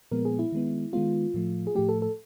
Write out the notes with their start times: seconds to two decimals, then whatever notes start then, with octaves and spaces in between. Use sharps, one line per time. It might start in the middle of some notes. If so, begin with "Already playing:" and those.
0.11 A#2 F3 G#3 B3 A#4
0.25 G#4
0.39 E4
0.52 D#3 G#3 B3
0.93 D#3 G#3 B3 F4
1.34 A2 F3 A3
1.67 G#4
1.75 A2 F3 A3 G4
1.89 A4
2.02 A4